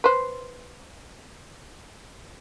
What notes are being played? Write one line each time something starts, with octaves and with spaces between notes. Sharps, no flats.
B4 C5